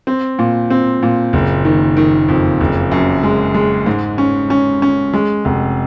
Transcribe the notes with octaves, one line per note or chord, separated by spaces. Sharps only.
C4
A#2
C4
A#2
F#1
D#3
D#3
F2
F#1
F#2
G#3
G#3
G#2
C#4
C#4
C#4
G#3
F1